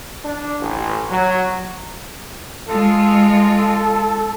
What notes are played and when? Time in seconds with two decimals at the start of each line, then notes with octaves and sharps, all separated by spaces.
0.25 D4
0.60 A1
1.10 F#3
2.69 G#3 F4 A4